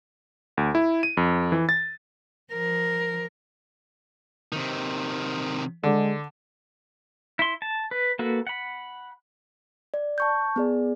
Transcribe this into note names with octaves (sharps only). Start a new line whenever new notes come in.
D2
E4
D#7
F2
E3
A6
F3 A#4
C3 D#3
D3 G#3
E4 C6
A5
B4
A#3 F#4 A4 B4
F#5 B5
D5
A5 C#6 G6
B3 G#4 D5